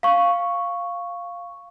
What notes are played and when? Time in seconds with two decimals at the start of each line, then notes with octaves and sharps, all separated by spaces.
0.03 F5 C#6